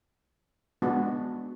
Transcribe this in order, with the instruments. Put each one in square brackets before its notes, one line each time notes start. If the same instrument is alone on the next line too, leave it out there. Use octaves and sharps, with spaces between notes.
[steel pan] G#3 B3 D4 F#4